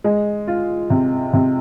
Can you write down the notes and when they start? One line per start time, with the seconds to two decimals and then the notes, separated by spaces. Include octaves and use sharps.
0.04 G#3
0.47 F4
0.90 C3
1.33 C3